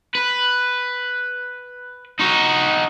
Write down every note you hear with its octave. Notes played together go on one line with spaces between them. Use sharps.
B4
D#4 F#4